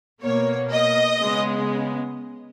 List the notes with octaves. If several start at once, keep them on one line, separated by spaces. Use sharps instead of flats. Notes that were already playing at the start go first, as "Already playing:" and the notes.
B2 A#3 C#5
D#5
C#3 G#3 B3